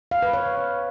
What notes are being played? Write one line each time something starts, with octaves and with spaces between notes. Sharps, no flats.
F5
B4
C#5